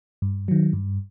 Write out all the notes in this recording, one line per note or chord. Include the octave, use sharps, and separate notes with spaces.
G2
D#3 F#3
G2